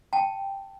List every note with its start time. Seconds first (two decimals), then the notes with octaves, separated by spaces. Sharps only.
0.13 G5 A5